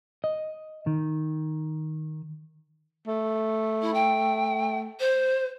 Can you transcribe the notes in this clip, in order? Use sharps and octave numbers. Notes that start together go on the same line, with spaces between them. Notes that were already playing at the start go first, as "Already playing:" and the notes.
D#5
D#3
A3
E4
G5
C5